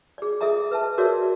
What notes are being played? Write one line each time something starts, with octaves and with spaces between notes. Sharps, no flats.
G#4 D5
G#4 A4 D#5 E5 A#5
B4 E5 A5
F#4 G#4 A#4 C#5 D5 E5